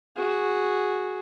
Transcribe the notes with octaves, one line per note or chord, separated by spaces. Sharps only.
F#4 G#4